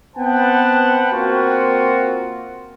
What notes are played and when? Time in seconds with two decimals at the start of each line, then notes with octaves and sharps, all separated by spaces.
0.16 B3 C4 B4 F#5 G5 A5
1.13 A#3 C4 F4 F#4